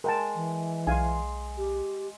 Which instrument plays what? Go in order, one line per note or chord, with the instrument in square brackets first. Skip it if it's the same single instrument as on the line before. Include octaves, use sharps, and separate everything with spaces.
[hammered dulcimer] G#3 [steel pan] A#4 G5 A5
[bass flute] E3
[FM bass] B1 [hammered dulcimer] G#4 C6 [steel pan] F5 G#5
[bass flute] G4